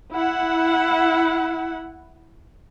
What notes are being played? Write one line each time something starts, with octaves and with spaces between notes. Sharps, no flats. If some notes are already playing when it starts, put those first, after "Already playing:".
E4 F#5